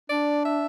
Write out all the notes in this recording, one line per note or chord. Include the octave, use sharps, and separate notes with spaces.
D4 D5
E5